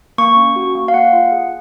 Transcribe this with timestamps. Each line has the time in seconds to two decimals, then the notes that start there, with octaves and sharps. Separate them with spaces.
0.18 A#3 C#6
0.37 C#4
0.56 F#4
0.75 A#3
0.88 F5
0.94 A#3 F#5
1.13 F4
1.32 G#4